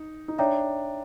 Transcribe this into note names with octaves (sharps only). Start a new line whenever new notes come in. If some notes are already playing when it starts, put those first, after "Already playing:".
Already playing: D#4
D#4
D4 C#5 E5 G5 A#5